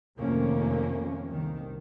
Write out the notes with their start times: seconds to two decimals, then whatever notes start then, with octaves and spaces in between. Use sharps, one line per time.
0.19 F2 C3 D#3 A3 A#3 C#4
1.29 C2 D#3